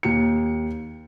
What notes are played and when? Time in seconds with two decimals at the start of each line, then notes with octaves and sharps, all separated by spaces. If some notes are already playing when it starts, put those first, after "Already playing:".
0.03 D#2 C#7